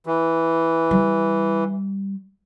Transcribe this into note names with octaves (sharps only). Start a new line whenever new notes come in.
E3
G3